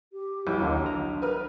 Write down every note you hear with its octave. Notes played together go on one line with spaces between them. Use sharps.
G4
B1 E3 E4
D#2 D3 D4
A#5
A#4 B4 F6